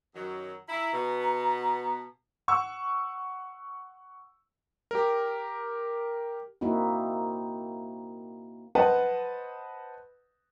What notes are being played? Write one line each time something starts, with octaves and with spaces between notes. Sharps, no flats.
F#2 D#3 F#3
E4 A#5
B2 B3
F#5 C#6 E6
G4 A#4
A#3 C4 D#4 E4 F#4
B4 C5 D#5 F#5 A5 B5